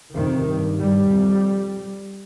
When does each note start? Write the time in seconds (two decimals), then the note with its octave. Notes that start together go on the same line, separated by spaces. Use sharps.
0.16 F2 C3 D#3
0.48 G2
0.80 G2 G3
1.11 F2